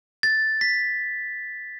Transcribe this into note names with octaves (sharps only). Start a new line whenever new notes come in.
A6
B6